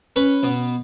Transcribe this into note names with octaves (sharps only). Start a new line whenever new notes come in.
C#4 B4
B2